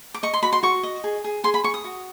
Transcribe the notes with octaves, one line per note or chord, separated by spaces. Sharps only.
D6
D#5 C#6
C6
F#4 B5
C6
F#4 C#6
D#5
G#4
G#4
G#4 C6
B5
G#4 C#6
D#6
F#4